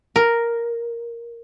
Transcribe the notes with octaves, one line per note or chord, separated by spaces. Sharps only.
A#4